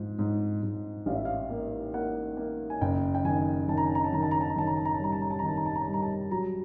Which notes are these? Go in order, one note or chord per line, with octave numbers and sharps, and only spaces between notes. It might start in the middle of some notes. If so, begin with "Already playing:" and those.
Already playing: G#2 F3
G#2
G#2
A1 F5
E5
F5
A#3
A#3 F#5
A#3
G#5
F#1 G5
G5
D#3 G#5
D#3 A5
A#5
A5
A#5
A5
D#3 A#5
A5
A#5
A5
A#5
D#3 A5
A#5
A5
A#5
A5
G3 A#5
A5
A#5
A5
A#5
D#3
A5
A#5
A5
A#5
G3 A5
A#5
A5
F#3 A#5